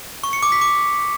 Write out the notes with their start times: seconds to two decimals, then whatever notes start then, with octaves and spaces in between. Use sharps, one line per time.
0.24 C#6
0.33 C#7
0.43 D6
0.52 B6
0.62 D6